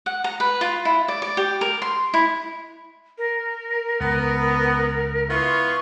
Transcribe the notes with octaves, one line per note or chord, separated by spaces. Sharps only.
F#5
A#5
B4
F4
E4
D5
D5
G4
A#4
C6
E4
A#4
C#2 B3
B3 E4 F4 C#6